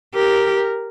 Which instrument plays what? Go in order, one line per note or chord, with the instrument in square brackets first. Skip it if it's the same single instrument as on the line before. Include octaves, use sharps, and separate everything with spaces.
[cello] G4 [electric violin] A#4